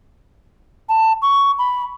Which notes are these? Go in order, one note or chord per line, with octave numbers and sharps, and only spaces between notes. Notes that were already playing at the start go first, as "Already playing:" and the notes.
A5
C#6
B5